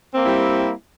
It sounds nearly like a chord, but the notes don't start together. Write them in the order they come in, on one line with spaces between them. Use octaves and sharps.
C4 A#3 E4 G3